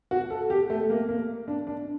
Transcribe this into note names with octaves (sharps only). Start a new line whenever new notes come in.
F#4
A4
G4
A3
A#3
A#3
D4
D4